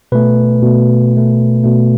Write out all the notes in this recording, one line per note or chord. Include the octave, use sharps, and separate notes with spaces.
B2 A3 B4
B2 A3
B2 A3
B2 A3